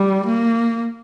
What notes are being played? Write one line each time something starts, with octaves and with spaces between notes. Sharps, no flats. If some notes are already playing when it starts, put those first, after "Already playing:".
Already playing: G3
A#3